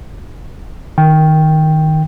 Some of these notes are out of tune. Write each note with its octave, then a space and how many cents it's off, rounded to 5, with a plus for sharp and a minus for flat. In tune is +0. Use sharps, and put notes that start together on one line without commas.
D#3 +0 G5 +0